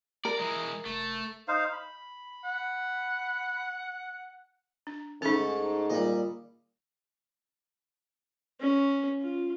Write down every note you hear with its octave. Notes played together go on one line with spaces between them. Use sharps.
A#4 D5
E3 G#3
F1 A3
D#4 C5 F5
B5
F#5
D4
G#2 A3 C#4 D#4 A4
A#2 G3 D#5
C#4
F4